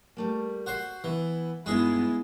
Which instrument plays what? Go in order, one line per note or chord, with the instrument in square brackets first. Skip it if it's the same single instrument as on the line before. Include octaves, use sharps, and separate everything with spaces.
[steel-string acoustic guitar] G3 A3 A#3
[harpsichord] F#4 C5
[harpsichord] E3 [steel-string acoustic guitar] B3 E4
[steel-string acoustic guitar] G2 B2 D#4 [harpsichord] G#3 G#4 [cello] B3 E4